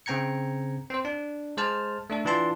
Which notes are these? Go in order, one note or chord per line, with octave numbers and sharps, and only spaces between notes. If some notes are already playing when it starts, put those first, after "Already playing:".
C#3 C4 G5 A#5 G#6 C#7
C4 C5
D4
G#3 C5 A5 F6
A3 D4 A4
E3 D4 F4 A5 C6